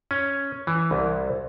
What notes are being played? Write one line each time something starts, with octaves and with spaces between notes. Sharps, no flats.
C#4
E3
C2